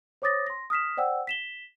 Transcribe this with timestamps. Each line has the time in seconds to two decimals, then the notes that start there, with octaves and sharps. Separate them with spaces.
0.22 C5 C#5 D6 D#6 A6 A#6
0.47 C6 A#6
0.70 D#6 F6 B6 E7
0.97 C5 D5 F#5 G5 E6
1.27 B6 E7 G7